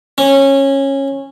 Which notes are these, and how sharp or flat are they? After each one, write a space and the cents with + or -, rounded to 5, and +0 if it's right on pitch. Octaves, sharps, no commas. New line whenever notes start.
C#4 -20